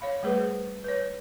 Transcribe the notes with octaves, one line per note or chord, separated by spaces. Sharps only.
C#5 F5 B5
G3 A3 G#4 B4 C5
B4 C#5